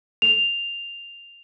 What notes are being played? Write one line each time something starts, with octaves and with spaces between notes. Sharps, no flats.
F7